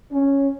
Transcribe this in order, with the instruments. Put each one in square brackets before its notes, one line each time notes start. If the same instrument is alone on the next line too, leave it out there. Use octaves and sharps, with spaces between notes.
[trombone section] C#4